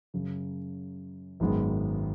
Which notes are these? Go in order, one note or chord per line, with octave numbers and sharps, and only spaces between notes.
F#2 C#3 F#3
G#1 F#2 D#3 G#3 B3